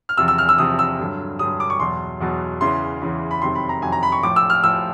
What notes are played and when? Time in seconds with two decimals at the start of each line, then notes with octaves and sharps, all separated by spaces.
0.09 F6
0.17 E2 C3 F3 E6
0.28 E6
0.38 F6
0.49 E6
0.58 E2 C3 F3 D#6
0.79 E6
0.99 G2 D3 F#3
1.39 G2 D3 F#3 D#6
1.60 D6
1.70 C#6
1.80 E2 B2 F#3 C6
2.20 E2 B2 F#3
2.61 E2 C#3 E3 C6
3.02 E2 C#3 E3
3.31 B5
3.42 F2 C3 D#3 F#3 C6
3.55 B5
3.69 A#5
3.82 F2 C3 D#3 F#3 G#5
3.92 A#5
4.03 B5
4.12 C#6
4.23 A2 F3 D6
4.36 E6
4.50 F6
4.63 A2 F3 E6